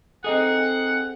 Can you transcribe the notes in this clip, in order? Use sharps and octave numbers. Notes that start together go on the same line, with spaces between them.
C4 D#4 G#4 A4 D#5 F#5